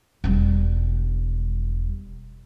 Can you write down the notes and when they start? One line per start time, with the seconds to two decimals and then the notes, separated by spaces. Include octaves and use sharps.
0.24 E1 G3